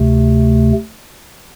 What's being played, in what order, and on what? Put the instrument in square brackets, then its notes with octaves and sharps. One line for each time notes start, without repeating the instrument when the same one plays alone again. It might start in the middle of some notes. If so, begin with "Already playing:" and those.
Already playing: [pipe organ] D2 C3 A3